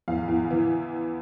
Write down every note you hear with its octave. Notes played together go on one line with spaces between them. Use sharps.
E2 F5
E2
E3